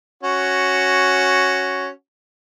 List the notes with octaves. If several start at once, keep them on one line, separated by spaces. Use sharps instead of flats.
C#4 F#4